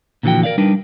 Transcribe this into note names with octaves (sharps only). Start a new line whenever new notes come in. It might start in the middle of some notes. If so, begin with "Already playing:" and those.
A#2 D3 E3 F3 F#4 G5
A#4 C5 D5 F5
G3 D4 D#4 A#4 B4